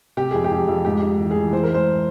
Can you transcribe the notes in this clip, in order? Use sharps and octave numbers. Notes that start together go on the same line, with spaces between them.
C3 G4
F2 G#4
G4
F2
F2
G#2 G4
G#2
E3
E3 G#4
E3 C5
A#4
G#2 C5